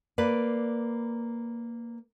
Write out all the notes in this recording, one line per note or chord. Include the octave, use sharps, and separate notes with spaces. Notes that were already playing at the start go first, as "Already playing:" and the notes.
A#3 B4 D5